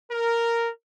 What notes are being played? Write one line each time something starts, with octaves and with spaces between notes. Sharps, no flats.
A#4